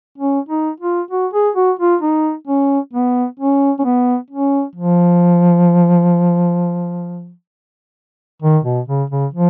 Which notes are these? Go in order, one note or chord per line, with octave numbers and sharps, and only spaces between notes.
C#4
D#4
F4
F#4
G#4
F#4
F4
D#4
C#4
B3
C#4
C#4
B3
C#4
F3
D#3
B2
C#3
C#3
F3